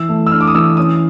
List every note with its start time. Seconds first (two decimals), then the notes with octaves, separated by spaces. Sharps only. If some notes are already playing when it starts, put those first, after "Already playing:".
Already playing: E3 E6
0.09 A3
0.27 E6
0.32 D4 F6
0.41 D6
0.47 D#6
0.55 E3 E6
0.77 C#4 D#6